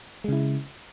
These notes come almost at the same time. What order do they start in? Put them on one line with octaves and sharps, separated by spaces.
G#3 C#3 E4